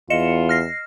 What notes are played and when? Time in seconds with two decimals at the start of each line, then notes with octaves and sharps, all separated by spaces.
0.10 E2 F4 D#5 C#7 E7
0.49 F6 A#6 C7